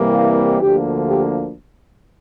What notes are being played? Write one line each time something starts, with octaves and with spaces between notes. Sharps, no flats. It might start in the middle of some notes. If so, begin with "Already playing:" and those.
Already playing: C2 C3 E3 G3 A#3
F5
D2 D3 F3 A#3 G4
G4